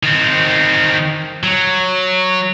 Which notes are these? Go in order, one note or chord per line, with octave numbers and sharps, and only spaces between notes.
D#3 C4
F#3